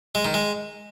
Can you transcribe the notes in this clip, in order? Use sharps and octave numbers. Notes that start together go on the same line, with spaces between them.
G#3
D#3
G#3